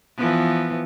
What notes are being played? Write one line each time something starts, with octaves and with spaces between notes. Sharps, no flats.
E3 F3 B3